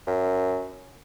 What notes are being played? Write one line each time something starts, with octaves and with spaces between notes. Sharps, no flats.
F#2